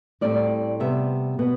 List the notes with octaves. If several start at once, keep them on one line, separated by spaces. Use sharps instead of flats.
A2 G3 C4 D5
C3 G3 B3 E5
B2 B3